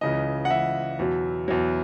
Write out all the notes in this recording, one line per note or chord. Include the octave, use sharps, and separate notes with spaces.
C#2 C#3 E3 D#5
F#5
C#2 C#3 E3 E5
E2 B2 F#3
E2 B2 F#3